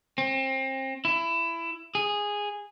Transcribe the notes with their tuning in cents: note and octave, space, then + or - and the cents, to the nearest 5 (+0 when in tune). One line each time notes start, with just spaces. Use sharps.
C4 +30
E4 +20
G#4 -10